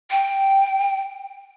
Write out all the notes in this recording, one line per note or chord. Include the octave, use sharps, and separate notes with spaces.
G5